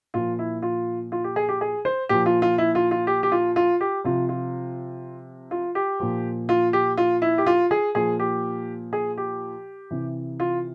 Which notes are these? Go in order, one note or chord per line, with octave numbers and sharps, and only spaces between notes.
A#2 F3 F4
E4
F4
F4
G4
G#4
G4
G#4
C5
A#2 F3 G4
F4
F4
E4
F4
F4
G4
G4
F4
F4
G4
C3 F3 F4
F4
F4
G4
A#2 F3
F4
G4
F4
E4
G4
F4
G#4
A#2 F3 G#4
G4
G#4
G4
C3 E3
F4